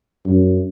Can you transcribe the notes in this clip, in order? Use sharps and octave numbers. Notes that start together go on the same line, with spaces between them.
F#2